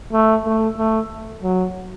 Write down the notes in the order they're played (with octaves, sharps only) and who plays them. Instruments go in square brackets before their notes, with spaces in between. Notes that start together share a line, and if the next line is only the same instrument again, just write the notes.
[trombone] A3
A3
A3
F#3